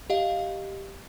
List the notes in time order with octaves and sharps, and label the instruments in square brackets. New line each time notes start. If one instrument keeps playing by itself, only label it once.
[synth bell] G4 D#5 F5